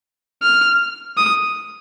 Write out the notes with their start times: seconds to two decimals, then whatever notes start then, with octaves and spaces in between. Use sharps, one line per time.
0.42 F6
1.17 D#6